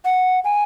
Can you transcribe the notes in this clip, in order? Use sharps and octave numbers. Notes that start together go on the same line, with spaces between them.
F#5
G#5